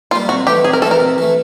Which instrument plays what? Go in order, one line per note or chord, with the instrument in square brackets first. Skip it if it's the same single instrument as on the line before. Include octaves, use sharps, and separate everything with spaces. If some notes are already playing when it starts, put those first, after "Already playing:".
[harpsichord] G3 A#3 [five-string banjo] F4
[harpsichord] C3 [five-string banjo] F#4
[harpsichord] E3 A3 [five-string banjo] G4
[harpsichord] C3 [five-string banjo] G#4
[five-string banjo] A#4
[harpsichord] E3 A3 [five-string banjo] A4
[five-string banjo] A#4
[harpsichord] C3
E3 A3